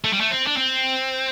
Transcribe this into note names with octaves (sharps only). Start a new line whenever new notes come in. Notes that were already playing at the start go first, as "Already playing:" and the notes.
A3
G3
A3
C4
D4
C4